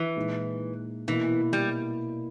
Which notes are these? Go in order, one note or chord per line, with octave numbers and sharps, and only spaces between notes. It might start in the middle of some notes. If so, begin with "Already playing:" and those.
Already playing: E3
A#2 G#3 D#4
B2 E3 A#3 E4
G3